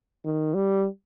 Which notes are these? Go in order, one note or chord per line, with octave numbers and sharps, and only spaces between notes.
D#3
G3